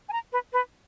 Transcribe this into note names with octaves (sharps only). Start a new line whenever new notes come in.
G#5
A#5
B4
B4